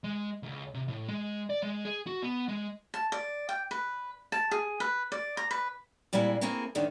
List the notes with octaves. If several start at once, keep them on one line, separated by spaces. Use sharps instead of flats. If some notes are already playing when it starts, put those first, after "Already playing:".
G#3
C#2
C3
A2
G#3
D5
G#3
G#4
F#4
B3
G#3
A5
D5
G5
B4
A5
G#4
B4
D5
A#5
B4
A#2 G3 G#3 C4 E4 D5
A3 A#3 C4 E4 G#4 A#4
F#2 D3 D#3 A3 D#4